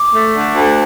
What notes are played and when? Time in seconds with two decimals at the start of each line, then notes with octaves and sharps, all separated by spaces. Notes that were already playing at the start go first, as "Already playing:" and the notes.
Already playing: D6
0.13 A3
0.33 D3
0.55 D2